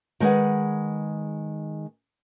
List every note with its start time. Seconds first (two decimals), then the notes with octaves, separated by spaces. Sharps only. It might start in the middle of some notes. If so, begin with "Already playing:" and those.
0.20 D#3 G#3 G#4 B4 F#5